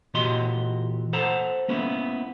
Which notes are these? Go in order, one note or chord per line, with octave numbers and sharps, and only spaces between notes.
A#2 E3 F#4 G4 D#5 C6
A4 C5 F#5 A5 A#5
A#3 B3 C#4 E4